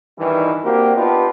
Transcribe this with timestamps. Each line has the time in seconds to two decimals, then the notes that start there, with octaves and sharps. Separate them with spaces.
0.19 G2 D#3 E3
0.64 A#3 C4 D4 F#4 G4 A#4
0.96 B3 D4 D#4 F4 G4 B4